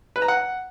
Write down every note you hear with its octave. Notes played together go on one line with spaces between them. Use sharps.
B4
A#5
F#5